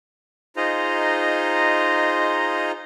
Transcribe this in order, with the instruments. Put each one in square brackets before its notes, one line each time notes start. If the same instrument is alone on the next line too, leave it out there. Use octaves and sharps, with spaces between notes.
[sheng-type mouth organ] D#4 F4 G#4 C5 D#5 A#5